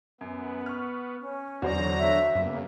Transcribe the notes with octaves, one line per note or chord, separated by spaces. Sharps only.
F#2 B3
C#6 F6
C#4
E2 D3 F#3 F#4 C5 D5 A#5
E5
F#2 C#3 A#3 B3